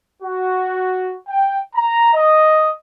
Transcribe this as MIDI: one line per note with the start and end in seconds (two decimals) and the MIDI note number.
0.23 1.13 66
1.28 1.58 79
1.75 2.12 82
2.13 2.71 75